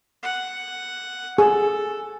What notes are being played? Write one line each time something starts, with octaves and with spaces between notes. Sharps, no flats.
F#5
G#4 A4